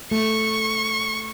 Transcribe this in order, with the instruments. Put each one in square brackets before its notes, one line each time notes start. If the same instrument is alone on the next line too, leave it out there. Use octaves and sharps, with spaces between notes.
[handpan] A3 [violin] C#6